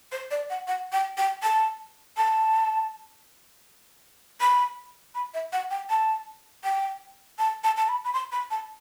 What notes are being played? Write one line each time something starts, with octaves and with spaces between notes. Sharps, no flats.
C5
D5
F#5
F#5
G5
G5
A5
A5
B5
B5
E5
F#5
G5
A5
G5
A5
A5
A5
B5
B5
C6
B5
A5